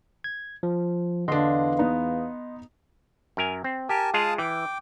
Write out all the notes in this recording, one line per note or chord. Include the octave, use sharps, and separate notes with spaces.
G#6
F3
E2 D3 D4 B4 D#5 F5 C6
B3 D#4
F#2 A#4 G#5
C4
G4 A#4 G#5 A5
G#3 F4 G#4 F5 A5 D#6
E3 G5 D6